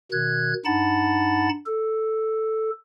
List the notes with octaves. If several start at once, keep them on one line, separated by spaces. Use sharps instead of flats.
B2 D#3 F#6 G#6
G2 D#4 F#5 A5 B5 A6
A4